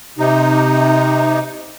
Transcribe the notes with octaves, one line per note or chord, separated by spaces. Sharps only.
C3 D#4